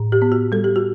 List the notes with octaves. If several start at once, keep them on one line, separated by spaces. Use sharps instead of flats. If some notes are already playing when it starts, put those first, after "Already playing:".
Already playing: A2
G4
B3
F#4
G3 A4
G4
F#4